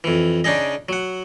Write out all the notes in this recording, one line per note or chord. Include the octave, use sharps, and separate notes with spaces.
F2 E3
C#3 D4 D#4 G#4 D#5
F#3 F#5